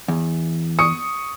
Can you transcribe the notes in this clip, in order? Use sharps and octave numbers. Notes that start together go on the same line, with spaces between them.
E2
C#6 D#6 C#7